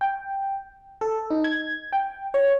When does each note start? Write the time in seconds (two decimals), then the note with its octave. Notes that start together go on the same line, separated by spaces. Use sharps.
0.01 G5
1.01 A4
1.30 D#4
1.44 G#6
1.93 G5
2.34 C#5